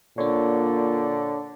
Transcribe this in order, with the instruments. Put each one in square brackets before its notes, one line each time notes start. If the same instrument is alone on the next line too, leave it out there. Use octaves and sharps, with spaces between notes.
[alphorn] A#2 [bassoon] D3 [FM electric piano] D4 C#5